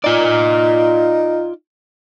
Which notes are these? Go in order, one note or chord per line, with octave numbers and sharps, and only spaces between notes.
D#4 F4 D5